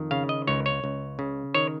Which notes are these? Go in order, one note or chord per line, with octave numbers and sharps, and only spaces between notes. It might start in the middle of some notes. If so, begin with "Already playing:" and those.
Already playing: F2 D#3
C#3 F5
D#5
C#2 C#5
C#5
C#2
C#3
D#3 C#5